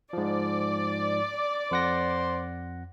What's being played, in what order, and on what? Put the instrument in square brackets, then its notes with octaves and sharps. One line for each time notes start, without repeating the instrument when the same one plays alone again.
[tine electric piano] G#2 F3 [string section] D5
[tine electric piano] F2 F#5 A#6 [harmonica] C5